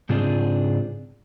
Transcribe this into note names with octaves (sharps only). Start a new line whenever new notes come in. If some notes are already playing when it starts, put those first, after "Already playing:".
G#2 C#3 C4 D4 F4 G#4